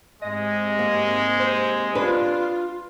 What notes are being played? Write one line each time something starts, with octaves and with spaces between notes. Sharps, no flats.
G#2 C3 G#3 D#5
A#3
C5
D4 F4 B4